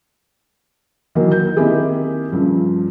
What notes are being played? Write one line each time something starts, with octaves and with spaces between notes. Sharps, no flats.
D#3 E3 F#3 A#3
G6
D#3 A#3 C4 E4 G4 G#4
G2 C#3 F3